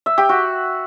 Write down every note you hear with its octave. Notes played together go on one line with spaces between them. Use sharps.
E5
G4
F#4